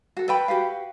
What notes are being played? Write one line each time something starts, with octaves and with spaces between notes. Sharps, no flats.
F#4 A4
A4 B4 G5 B5
F#4 G4 B4 F5